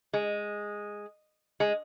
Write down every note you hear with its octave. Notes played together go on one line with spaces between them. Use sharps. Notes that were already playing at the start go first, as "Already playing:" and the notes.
G#3
G#3